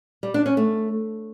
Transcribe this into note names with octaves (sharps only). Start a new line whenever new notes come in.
G3
D4
C#4
A3